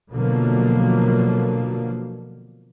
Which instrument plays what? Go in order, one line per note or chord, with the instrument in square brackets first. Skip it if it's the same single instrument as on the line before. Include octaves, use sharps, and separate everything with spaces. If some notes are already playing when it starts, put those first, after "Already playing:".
[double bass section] B2 D3 F3 F#3 A#3